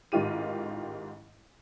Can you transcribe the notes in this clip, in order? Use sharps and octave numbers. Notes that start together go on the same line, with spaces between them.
A1 G#2 D#3 F4 G4 D#7